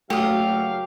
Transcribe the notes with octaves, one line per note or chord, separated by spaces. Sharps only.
F#1 F#3 A3 F#4 G4 F5 G5 D#6